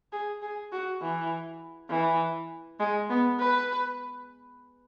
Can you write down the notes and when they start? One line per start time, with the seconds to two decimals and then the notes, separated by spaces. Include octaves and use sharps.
0.13 G#4
0.42 G#4
0.72 F#4
1.02 E3
1.90 E3
2.80 G#3
3.10 B3
3.40 B4